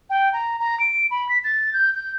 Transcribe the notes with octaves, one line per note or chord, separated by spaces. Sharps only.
G5
A#5
A#5
D7
B5
B6
A6
G6
G6